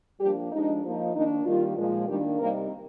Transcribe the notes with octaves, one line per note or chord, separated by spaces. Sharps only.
F3 G3 A#3 D4 G4
F3 G#3 D4 D#4
F3 A#3 D#4
D#3 A#3 D4 D#4
D#3 G3 A#3 F4
A#2 F3 G#3
D#3 G3 A#3 D4 G4
C3 G3 A#3 C4 D#4 A#4